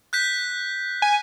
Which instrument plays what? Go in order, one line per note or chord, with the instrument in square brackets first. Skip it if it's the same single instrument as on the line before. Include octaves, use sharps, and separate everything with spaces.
[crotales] F#6 G6 B6
[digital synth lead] G#5